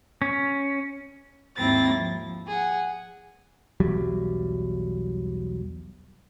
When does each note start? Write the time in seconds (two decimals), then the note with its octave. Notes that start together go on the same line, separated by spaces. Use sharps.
0.22 C#4
1.58 D#2 G#2 C4 E4 A6 A#6
1.94 F3
2.49 G#4 F#5
3.80 B1 E2 F#3 G3